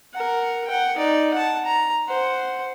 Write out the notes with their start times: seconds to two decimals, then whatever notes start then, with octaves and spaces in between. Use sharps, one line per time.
0.13 A#4 F#5
0.67 F#5 G5
0.97 D#4 D5
1.34 F#5 A5
1.65 A#5
2.08 C5 F#5